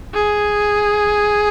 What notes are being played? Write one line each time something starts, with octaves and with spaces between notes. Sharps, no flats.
G#4